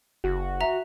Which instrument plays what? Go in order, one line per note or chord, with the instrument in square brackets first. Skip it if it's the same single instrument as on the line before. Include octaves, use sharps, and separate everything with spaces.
[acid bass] F#1 [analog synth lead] F#4
[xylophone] E5 A#5